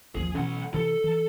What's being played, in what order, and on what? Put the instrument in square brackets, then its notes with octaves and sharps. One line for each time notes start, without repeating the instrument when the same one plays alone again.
[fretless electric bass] A1 D#2 F3 [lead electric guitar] G#4
[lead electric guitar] B1 F#5 [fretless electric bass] B2 E3 C#4
[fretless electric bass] C3 E3 [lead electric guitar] A4
[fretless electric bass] E3